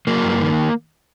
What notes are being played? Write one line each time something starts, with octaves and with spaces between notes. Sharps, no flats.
F#3 A#3
G2
D#3